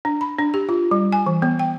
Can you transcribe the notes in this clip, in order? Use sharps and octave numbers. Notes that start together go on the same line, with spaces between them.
D4
B5
D4
G4
F4
G3
G#5
E3
B3
G5